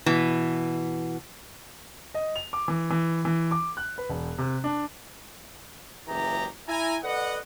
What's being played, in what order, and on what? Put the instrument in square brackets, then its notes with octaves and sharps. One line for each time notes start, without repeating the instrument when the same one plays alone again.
[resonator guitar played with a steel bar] B2 E3
[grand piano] D#5
F7
D6
E3
E3
E3
D6
F#6
B4
E1
C3
D4
[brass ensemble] F#1 C#2 E3 G4 G#4 A#5
E4 G#5 A#5
A4 B4 D5 D#5 F#5